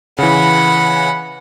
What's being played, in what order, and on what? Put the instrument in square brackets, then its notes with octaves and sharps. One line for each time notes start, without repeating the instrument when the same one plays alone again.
[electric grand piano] C#3 E3 [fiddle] F#5 B5